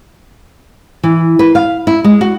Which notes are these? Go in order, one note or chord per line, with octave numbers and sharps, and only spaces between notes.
E3
B4
F5
E4
G#3
F#4